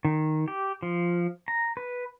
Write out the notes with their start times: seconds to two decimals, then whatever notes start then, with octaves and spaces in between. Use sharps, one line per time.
0.05 D#3
0.48 G4
0.82 F3
1.48 A#5
1.77 B4